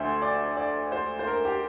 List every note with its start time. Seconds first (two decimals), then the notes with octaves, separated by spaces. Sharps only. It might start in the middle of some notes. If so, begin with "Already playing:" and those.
Already playing: D2 C5 E5
0.22 D5
0.57 D5
0.92 C5
1.19 C5
1.27 A#4
1.45 G4